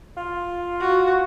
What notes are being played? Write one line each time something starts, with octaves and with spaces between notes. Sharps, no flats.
F4
F#4